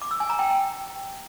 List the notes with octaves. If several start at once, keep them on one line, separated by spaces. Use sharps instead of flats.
D6
E6
G#5
A#5
G5